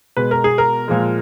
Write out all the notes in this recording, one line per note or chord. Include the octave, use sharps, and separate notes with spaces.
B2 G#3 B4
A#4
G#4
A#4
A#2 F3 G#3